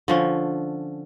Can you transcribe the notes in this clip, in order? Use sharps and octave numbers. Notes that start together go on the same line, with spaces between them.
D3 F3 C#4